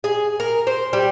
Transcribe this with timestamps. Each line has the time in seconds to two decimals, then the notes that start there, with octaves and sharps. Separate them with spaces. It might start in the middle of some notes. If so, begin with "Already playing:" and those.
0.04 G#4
0.40 A#4
0.67 C5
0.93 G3